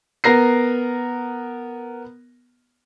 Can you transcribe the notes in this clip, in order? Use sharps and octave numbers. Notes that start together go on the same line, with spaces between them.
B3 A#4 A#6 C7